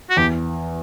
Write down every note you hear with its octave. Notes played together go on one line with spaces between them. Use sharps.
F#4
E2 G4